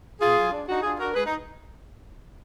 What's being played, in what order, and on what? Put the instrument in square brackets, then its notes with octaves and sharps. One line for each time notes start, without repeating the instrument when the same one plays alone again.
[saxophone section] B2 F4 G#4
F#3
D4
D4 D#4 F#4
D4 F4 G#4
D4 F#4 A#4
G#3 G#4 B4
D#4